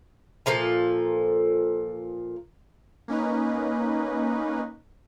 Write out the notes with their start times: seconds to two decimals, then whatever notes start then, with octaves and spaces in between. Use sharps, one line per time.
0.46 A#2 F3 A4 A#5
3.08 A#3 C#4 D#4 B4